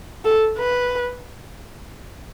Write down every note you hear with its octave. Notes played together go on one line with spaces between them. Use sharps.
A4
B4